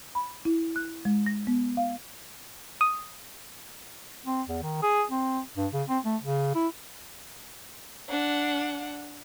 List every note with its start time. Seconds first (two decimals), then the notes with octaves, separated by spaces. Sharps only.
0.15 B5
0.45 E4
0.76 F#6
1.05 G#3
1.26 A#6
1.47 B3
1.77 F5
2.81 D#6
4.26 C4
4.49 E2
4.62 D#3
4.82 G#4
5.11 C4
5.57 G2
5.73 C#3
5.89 C4
6.04 A3
6.23 C#3
6.55 E4
8.09 D4 F#5